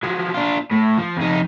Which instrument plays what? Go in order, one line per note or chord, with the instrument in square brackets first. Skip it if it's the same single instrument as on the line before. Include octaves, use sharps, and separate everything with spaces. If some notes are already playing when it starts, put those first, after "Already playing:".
[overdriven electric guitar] F3 F#3
D4 F4
A2
F3
F2 D#4